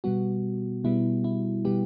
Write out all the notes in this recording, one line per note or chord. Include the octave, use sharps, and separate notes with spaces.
B2 G3 B3 F#4
B2 G3 B3 E4
E4
B2 G3 B3 G4